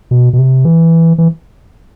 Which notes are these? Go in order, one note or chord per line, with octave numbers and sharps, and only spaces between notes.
B2
B2
C3
E3
E3